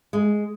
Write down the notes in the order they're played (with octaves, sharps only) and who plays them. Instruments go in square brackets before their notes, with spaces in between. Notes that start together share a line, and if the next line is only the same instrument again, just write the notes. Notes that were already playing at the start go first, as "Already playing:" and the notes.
[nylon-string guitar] G#3